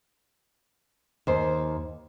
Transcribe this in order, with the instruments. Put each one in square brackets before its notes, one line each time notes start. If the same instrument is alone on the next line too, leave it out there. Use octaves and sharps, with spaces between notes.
[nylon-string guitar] D#2 C5